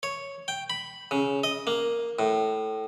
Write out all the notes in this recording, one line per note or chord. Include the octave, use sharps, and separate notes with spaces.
C#5
G5
B5
C#3
D#5
A#3
A2